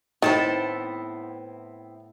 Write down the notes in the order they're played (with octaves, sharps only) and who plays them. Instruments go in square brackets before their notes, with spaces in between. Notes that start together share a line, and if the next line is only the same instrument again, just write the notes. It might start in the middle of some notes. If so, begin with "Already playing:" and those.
[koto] A2 A4 [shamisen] D#3 [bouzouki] B3 C4 E4